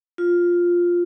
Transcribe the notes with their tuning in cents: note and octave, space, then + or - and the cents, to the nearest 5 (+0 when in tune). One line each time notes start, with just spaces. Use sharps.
F4 +5